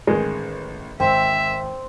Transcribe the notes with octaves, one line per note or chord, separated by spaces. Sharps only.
A1 D#3 G#3
G#1 C4 E5